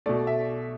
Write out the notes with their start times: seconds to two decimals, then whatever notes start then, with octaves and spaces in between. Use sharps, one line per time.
0.06 B2 A3 D5
0.27 E5